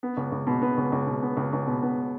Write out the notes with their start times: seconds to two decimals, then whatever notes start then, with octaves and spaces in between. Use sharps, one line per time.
0.03 B3
0.17 C#2
0.32 C#2
0.47 B2
0.62 B3
0.77 C#2
0.92 C#2
1.07 B2
1.22 B3
1.37 C#2
1.53 C#2
1.67 B2
1.82 B3